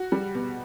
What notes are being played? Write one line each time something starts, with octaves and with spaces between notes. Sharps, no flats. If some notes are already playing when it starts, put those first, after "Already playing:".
Already playing: F#4
G3
B2